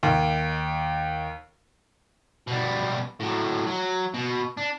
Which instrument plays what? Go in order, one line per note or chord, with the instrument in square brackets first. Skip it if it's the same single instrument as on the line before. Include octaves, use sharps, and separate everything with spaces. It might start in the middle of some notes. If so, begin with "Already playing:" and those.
[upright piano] D#2
[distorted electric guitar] B2 G3
A2 F#3
F#3
B2
D4